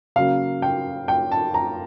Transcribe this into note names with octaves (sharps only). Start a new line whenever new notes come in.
C#3 F#3 A#3 F5
G5
G5
A5
A#5